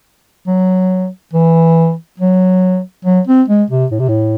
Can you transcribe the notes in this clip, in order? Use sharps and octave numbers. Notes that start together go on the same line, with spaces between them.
F#3
E3
F#3
F#3
C4
G#3
C3
A2
C3
A2